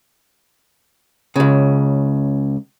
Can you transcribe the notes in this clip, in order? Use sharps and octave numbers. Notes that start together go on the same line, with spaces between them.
C#2 C#3